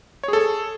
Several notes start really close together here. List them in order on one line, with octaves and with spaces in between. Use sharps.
C#5 G#4 A4